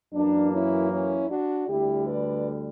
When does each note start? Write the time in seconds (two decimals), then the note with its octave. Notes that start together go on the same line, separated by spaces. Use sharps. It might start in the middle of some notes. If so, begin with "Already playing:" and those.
0.13 F#2 E3 A#3 D4
0.52 C#4 E4
0.90 C#4 E4
1.28 D4 F#4
1.67 D2 D3 G3 E4 G4
2.06 B4 D5